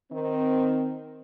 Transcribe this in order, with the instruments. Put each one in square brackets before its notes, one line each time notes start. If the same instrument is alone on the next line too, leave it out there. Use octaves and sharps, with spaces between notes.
[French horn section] D#3 C4